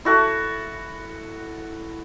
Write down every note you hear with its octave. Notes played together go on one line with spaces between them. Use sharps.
E4 F#4 A4